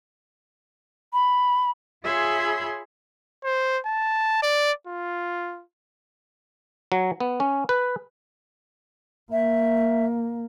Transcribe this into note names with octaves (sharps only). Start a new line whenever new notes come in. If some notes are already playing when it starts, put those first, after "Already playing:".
B5
F4 G#4 C#5 E5 B5 C6
C5
A5
D5
F4
F#3
B3
C#4
B4
A#3 E5